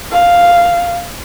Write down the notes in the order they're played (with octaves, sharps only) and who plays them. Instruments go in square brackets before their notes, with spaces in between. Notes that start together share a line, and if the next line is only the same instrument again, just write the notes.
[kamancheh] F5